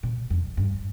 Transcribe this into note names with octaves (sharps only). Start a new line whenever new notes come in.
A#2
F2
G2